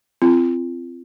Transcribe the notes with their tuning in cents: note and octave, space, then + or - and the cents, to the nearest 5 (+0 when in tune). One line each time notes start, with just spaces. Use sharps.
C4 -10 F4 -35